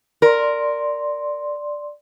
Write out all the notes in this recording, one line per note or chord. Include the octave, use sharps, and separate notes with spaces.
A#4 D5 C6